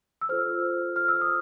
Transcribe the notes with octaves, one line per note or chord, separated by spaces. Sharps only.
E6
F4 A4 C5 F6
F6
E6
D#6